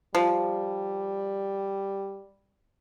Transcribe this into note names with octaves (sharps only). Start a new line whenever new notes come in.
F3 G3